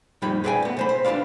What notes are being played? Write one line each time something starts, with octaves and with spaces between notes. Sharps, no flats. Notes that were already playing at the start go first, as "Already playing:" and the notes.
F2 A#2 G3 D#4 G5 B5
G#4 B4 D5 D#5 G5 G#5
A3 B3
B1 C5 B5
C5
D4 F4 B4 D5 F5